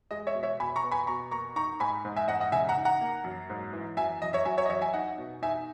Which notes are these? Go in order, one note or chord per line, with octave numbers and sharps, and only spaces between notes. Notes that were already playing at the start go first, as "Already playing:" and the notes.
G#3 D#5
C#5 E5
B2
C#5 E5
B2 G#5 B5
A#5 C#6
B3
G#5 B5
B2 A#5 C#6
A#3 A#5 C#6
D#4 A#5 C#6
G#2 G#5 B5
G#2
E5 G#5
G#2 D#5 F#5
D#5 F#5
C#3 E5 G#5
F#5 A#5
D#4
F#5 A#5
A#3
F#2
G#2
E3
F#2 E5 G#5
F#2 D#5
C#5 E5
F#3 E5 G#5
C#5 E5
D#5
F#2 C#5 E5
E5 G#5
D#4 D#5 F#5
B2
D#4 E5 G#5